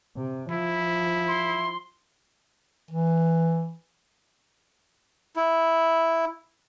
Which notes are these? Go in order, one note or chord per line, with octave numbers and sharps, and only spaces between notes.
C3
F3 E4
C6
E3
E4